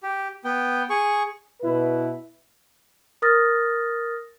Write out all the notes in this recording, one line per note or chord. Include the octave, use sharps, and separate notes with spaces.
G4
B3 G5
G#4 C#6
B2 E4 B4
A#4 D#6 F6 A6 A#6